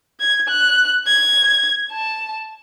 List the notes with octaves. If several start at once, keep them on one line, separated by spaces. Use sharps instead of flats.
G#6
F#6
G#6
A5